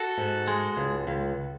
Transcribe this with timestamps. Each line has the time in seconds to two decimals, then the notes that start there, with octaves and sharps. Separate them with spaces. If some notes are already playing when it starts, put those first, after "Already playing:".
Already playing: F#4 A4
0.18 G#2
0.48 G#3
0.77 C#2
1.07 C#2